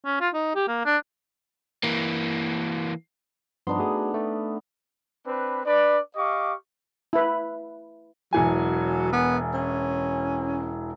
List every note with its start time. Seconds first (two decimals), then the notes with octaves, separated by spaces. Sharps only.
0.05 C#4
0.21 F4
0.34 D#4
0.55 G4
0.68 A#3
0.86 D4
1.83 E3 A#3
3.67 G2 F3 B3 D4 D#4 C6
3.78 A3 F#4 G#4
4.14 A3
5.26 C4 D4 B4
5.66 D4 B4 D5
6.16 G4 D#5 F5 C#6 D6
7.13 E4 B4
8.33 E1 E3 F#3 G#5
9.13 B3
9.54 C#4